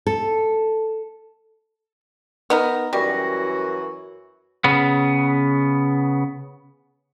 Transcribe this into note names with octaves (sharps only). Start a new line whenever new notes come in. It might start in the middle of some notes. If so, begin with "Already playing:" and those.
A4
B3 D#4 A#4
F#2 E3 G3 F#4 A#4
C#3 B3